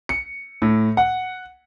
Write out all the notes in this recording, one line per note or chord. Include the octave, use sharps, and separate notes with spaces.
C#7
A2
F#5